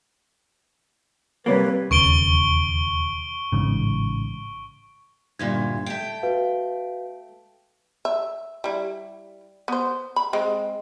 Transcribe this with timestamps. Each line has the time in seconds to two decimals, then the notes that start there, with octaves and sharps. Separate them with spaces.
1.46 C3 G3 A#3 B4 C#5 D5
1.91 E1 D#2 C#3 C#6 D7 G7
3.52 A1 G#2 C#3
5.39 D2 G2 A#2 G#6
5.86 A3 G5
6.23 F#4 B4 F5
8.05 E5
8.64 G3 E4
9.68 B3 C5
10.16 B5
10.33 G#3 C4